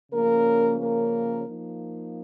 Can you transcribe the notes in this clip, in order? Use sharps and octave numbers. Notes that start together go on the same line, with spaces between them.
C#3 F3 A#3 C#4 A#4
A#3 A#4
F3 A#3 D#4